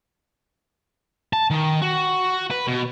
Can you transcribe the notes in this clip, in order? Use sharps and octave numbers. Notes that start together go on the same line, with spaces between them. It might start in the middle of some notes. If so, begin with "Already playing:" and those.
A5
D#3
F#4
B4
B2